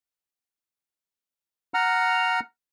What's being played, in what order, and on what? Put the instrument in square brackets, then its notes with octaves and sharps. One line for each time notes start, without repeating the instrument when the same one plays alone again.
[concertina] F#5 A#5 F6